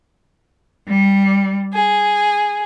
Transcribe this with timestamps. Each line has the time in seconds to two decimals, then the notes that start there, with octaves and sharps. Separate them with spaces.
0.86 G3
1.73 G#4